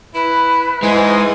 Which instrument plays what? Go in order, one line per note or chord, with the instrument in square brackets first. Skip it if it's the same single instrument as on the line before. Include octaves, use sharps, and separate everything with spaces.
[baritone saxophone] E4 [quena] B4
[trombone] G#2 [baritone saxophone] E3 [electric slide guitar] G#3 [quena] C5